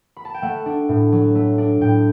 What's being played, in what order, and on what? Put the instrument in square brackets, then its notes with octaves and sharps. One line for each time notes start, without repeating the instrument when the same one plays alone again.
[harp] B5
A5
G5
A3 F#5
D4
A2
F#3
A3
D4
A2 G5